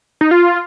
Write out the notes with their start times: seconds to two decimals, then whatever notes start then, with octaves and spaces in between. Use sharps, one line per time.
0.21 D#4
0.31 F4